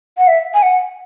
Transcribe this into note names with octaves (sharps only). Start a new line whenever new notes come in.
F#5
E5
G#5
F#5